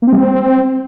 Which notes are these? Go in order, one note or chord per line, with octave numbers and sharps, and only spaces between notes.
A#3
C4
G3
C4